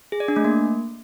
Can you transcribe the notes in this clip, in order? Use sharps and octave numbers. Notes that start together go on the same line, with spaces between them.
G#4
D5
D4
A3
A#3